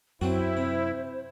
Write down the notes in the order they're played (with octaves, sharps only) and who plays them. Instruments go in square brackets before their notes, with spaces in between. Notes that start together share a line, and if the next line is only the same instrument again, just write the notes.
[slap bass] F#2 [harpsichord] F#3 C4 F#4 [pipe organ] E4 [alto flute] C5
[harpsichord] C3